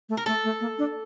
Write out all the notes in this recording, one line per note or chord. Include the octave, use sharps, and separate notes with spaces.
A3
A#4
A3 A4
A3
A#3
D4